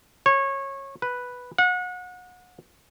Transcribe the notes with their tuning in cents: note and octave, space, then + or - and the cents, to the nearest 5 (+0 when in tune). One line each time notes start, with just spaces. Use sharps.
C#5 -20
B4 +0
F#5 -35